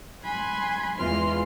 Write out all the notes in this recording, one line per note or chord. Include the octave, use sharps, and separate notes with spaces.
G#5 B5 C6 F#6 G#6
E2 E3 G#3 F4 C6 F6